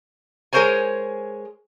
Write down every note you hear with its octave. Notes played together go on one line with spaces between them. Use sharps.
G#3 G#4 A#4 C5 C#5 G#5